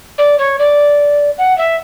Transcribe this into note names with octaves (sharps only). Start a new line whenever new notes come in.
D5
C#5
D5
F#5
E5